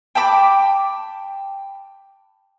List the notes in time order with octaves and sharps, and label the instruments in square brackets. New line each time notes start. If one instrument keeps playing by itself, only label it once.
[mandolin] G5 A5 B5 D6